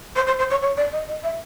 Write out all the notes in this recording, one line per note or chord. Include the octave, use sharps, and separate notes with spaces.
C5
C5
C5
C#5
C#5
D5
D#5
D#5
E5